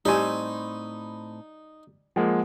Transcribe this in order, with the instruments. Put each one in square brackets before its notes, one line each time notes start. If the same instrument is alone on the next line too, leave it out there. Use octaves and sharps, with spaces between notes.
[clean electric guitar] A2 C4 C5 [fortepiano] G3 G#5 [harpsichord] D#4
[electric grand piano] F3 G#3 A#3 [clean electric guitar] F#5